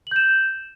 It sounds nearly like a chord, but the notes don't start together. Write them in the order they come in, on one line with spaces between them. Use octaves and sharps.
F#7 G6 E7